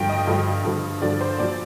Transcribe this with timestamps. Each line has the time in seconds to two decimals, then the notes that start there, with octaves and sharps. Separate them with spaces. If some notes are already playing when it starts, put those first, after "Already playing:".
Already playing: G2 D3 F3 G5
0.09 D#5
0.27 G2 D3 F3
0.64 G2 D3 F3
1.02 G2 D3 F3 D5
1.21 C5
1.39 A#2 F3 D5